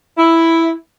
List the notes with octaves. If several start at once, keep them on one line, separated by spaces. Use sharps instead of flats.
E4